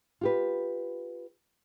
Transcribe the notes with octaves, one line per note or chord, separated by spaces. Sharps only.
F4 G4 B4